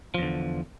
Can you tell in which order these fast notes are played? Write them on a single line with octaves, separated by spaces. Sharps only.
F3 E2 D3